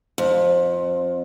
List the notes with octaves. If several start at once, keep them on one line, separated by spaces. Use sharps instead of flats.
F2